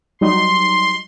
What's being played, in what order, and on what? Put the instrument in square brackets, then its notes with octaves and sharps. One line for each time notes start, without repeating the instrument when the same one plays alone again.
[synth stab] F#3 G3 D#4 [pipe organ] C6